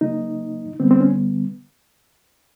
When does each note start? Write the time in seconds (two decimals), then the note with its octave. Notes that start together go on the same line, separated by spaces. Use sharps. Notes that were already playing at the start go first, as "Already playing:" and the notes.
0.01 C#3 F#3 A#3 D#4
0.80 D3 G3 B3 C4
0.91 C4
1.00 C#4